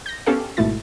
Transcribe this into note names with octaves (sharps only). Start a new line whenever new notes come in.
G6 A#6
B3 C#4 G4 A4 F5
G#1 G#2 B2 A3 E4 A6